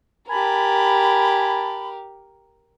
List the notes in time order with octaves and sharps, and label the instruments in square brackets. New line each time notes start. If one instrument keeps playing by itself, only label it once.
[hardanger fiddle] G4 A#4 [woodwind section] G#5 A5 B5